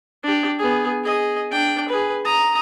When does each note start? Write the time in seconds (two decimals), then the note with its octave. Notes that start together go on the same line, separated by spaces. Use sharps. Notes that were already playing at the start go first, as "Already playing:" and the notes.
0.23 D4 G4
0.59 B3 G#4
1.04 G#4 D#5
1.51 D4 G5
1.89 G#4 B4
2.25 A#5 D#6